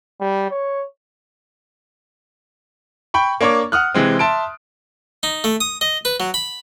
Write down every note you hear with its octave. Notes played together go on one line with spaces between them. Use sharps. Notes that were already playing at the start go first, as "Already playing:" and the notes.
G3
C#5
G5 B5 C#6
A#3 D4 C#5 C#6 D6
F#5 D#6 F6 F#6
C3 E3 G#3 C4
E5 A5 C6 D7
D#4
A3
D#6
D#5
B4
F#3
B5